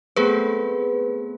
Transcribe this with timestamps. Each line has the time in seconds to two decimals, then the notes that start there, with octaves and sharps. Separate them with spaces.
0.16 A3 B3 C4 G#4 B4